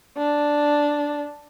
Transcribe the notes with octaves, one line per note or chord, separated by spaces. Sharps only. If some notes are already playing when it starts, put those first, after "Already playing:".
D4